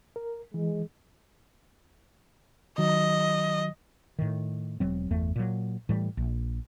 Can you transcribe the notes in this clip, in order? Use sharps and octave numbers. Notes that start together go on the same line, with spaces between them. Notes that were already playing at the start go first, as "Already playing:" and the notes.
A#4
E3 G#3
D#3 F#3 D#5
A2 D#3
E1 F#3 C4
G1 E2 A3
A#2 F#3
A2 E3 G3
A#1